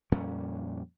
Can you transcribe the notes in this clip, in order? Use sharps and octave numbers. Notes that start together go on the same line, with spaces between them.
F2 A#2 G3 C#4